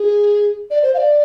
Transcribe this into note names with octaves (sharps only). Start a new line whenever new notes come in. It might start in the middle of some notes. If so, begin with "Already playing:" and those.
Already playing: G#4
D5
C5
F5
D5